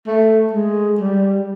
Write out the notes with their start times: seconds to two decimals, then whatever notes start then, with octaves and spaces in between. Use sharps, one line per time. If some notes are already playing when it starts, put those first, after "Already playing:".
0.07 A3
0.53 G#3
1.00 G3